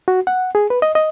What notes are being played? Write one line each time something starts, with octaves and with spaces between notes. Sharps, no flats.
F#4
F#5
G#4
B4
D#5
D#5